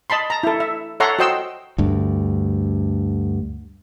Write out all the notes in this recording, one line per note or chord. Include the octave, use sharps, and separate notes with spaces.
D#5 A5 B5 C6
A5 A#5
E4 A4
E5
A4 C#5 E5 F#5 A#5 C6
F#4 C5 D#5 G5 C6 E6
D2 G2